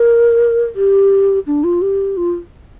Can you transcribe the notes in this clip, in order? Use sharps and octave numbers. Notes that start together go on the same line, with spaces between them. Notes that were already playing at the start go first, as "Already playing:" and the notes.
Already playing: A#4
G4
D4
F4
G4
F4